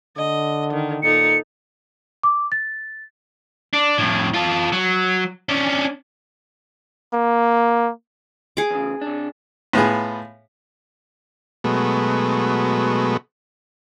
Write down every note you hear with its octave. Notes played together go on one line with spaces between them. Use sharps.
D3 D#5
D#3
A#2 D#4 A4 C#7
D6
A6
D4
F2 A2
F4 A4
F#3
C#4 D4
A#3
G#4 D6
E2 C#3
C3 D4
A2 B3 F4 G#4
B2 F#3 G#3 A3 B3